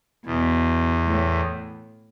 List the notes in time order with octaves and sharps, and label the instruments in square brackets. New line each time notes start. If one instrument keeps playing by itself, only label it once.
[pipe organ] E2 [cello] B2
[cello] A2